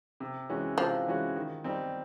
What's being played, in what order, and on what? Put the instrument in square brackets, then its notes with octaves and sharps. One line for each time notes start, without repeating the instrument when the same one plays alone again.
[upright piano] C3
E3 G#3 C#4 F#4
[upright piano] C3 [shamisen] F3
[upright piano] E3 G#3 C#4 F#4
D#3
G3 C4 D#4